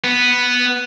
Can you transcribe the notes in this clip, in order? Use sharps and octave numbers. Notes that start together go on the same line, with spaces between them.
B3